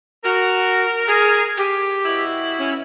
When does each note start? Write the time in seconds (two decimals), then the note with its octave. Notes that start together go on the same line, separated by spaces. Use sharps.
0.25 F#4 A#4
1.07 G#4
1.57 G4
2.05 B2 E4
2.58 C#4